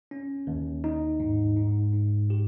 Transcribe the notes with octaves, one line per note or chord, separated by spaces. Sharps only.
C#4
D#2
D#4
G#2
G#2
G#2
G4